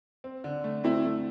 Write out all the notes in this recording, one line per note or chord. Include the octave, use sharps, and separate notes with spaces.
C4
D3
A3
A3 C4 E4
A3